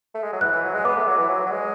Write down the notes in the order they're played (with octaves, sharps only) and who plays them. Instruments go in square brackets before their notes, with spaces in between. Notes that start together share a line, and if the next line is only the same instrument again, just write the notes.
[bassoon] A3
G#3
F#3
[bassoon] E3 [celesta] F#6
[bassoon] E3
F#3
G#3
[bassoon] B3 [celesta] D6
[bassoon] A3
F#3
E3
F#3
F#3
G#3